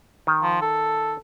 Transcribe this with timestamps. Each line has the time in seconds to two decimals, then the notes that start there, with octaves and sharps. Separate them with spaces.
0.27 D#3
0.42 F3
0.61 A4